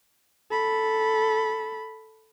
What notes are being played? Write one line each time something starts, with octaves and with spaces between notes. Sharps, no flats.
A4 B5